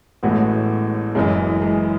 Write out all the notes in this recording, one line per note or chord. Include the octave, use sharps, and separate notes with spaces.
A1 A2 G#3 A3 B3 F#4
F#1 F#2 E3 G#3
G#3